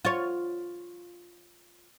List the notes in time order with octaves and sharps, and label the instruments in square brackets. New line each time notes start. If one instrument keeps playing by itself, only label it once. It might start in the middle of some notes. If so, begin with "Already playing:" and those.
[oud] F4 C#5